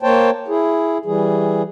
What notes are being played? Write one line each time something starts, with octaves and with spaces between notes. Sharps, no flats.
A#3 C5 C#5 G5 A5
E4 G#4
E3 G3 G#4